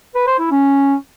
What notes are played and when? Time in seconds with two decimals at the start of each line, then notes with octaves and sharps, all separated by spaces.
0.15 B4
0.27 C5
0.39 E4
0.51 C#4